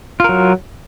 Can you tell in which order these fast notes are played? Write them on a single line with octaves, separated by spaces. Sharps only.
F4 A#4 F#3